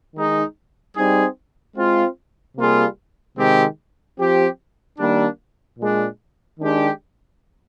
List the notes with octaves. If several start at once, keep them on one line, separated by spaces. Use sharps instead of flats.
D#3 G#3 D#4
G3 C4 D#4 G#4
G#3 C4 F4
C3 G3 A#3 F4 G#4
C3 D#3 G#3 C4 G4
F3 C4 G4
D#3 G3 A#3 D4
A#2 G#3 D4
D#3 G#3 D4 G4